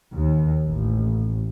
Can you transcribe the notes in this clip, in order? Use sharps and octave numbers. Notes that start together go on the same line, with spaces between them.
D#2
A1